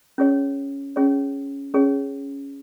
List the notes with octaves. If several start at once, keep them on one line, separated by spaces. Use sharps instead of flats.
C#4 G#4 C#5
C#4 G#4 C#5
C#4 G#4 C#5